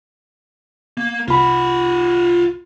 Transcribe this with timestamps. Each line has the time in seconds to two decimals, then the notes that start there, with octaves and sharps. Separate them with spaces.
0.97 A#3
1.28 C2 F4 F#5 B5